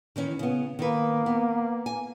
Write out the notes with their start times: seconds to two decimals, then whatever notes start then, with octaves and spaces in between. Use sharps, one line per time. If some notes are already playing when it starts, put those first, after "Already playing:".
0.16 D#3 E3 C#4
0.39 C#3 B3
0.79 D#3 A#3 B4
1.26 B3
1.86 G#5